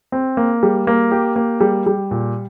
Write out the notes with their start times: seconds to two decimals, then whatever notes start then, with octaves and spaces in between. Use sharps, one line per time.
0.12 C4
0.37 A#3
0.63 G3
0.87 A#3
1.12 G4
1.36 A#3
1.61 G3
1.86 G3
2.11 A#2